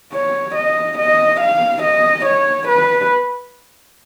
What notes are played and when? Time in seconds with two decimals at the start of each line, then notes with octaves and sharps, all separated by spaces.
0.13 C#5
0.55 D#5
0.98 D#5
1.40 F5
1.83 D#5
2.25 C#5
2.68 B4